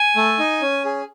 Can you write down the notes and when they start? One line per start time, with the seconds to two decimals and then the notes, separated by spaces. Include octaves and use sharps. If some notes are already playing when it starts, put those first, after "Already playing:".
Already playing: G#5
0.16 A3
0.39 D#4
0.61 C#4
0.85 G#4